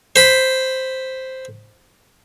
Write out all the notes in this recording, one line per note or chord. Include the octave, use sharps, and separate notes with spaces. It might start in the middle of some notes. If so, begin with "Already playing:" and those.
C5 B5